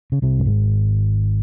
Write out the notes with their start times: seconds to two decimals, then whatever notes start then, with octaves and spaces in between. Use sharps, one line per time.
0.12 C#3
0.22 C2 C3
0.39 G2
0.45 G#1 G#2